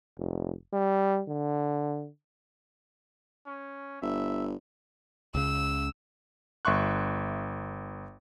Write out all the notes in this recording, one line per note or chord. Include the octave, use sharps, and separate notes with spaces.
F1
G3
D3
C#4
G1 E5
C#2 C#3 E6
G1 E5 C6 C#6 F#6